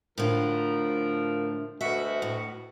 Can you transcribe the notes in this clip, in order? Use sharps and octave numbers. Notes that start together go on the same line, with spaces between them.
A2 D3 F3 A#4
D2 B2 F#4 E5
A2